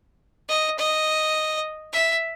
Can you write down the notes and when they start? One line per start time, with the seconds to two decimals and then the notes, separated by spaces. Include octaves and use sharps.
0.49 D#5
0.79 D#5
1.93 E5